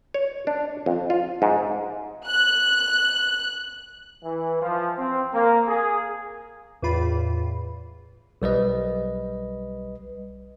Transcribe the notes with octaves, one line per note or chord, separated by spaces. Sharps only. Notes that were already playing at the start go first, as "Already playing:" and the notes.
C#5
D4
F2
F4
G#2
F#6
E3
F3
C4
A#3
G#4
E2 A2 F4 B5
B1 G3 B4 D#5